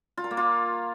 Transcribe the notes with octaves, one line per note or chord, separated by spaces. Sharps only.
F4
A#4
A#3
F4